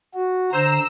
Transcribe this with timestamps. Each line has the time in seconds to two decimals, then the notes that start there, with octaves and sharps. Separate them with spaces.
0.14 F#4
0.53 D3 C5 A#5 E6